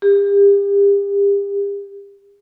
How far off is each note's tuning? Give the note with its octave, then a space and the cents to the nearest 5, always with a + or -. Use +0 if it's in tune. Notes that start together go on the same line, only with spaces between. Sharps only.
G4 +35